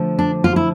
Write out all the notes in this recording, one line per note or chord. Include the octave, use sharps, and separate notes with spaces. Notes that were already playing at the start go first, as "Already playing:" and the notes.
Already playing: D3 F3 A3
D4
F4
E4